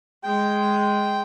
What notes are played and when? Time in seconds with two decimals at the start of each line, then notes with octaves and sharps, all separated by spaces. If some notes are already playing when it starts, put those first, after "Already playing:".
0.24 G#3 G5